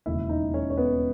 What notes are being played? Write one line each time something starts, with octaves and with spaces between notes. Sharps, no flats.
E1 D#2 C#3 E3 E4 E5
D#4 D#5
C#4 C#5
C#5
B3 B4